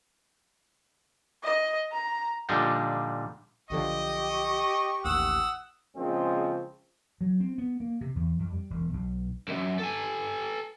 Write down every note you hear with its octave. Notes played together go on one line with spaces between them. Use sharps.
D#5
A#5
A#2 D3 F3 G3 D4 D#4
B1 D3 F3 G4 D#5 C#6
A1 D#2 F#5 D#6 E6
A#1 C#3 F3 G#3 C4 C5
F#3
C4
B3
A#3
C3
E2
F2
G3
E1
B1
C2 F#2
A4 G#5